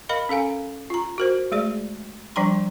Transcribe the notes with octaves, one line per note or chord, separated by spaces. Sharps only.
A#4 D#5 F5 B5
C#4 A4 F5 G#5
F4 A#5
F#4 A#4 C5
G#3 A3 G#4 D5
F3 G3 D4 G5 A#5 C6